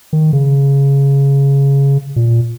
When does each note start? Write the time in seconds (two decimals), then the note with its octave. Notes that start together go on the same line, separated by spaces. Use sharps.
0.13 D#3
0.33 C#3
2.16 A#2